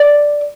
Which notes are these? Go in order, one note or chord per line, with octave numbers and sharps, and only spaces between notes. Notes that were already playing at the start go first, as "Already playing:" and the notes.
Already playing: D5